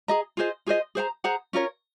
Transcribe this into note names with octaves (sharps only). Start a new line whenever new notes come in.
G#4 D#5 A#5
F4 G#4 C5 D#5
F4 G#4 C5 D#5
G#4 C5 F#5 A#5
G#4 C5 F#5 A#5
C#4 F4 A#4 C#5